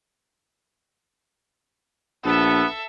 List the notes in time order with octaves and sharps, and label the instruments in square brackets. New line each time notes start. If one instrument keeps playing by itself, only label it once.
[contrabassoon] A#1 [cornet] B3 [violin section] A4 E5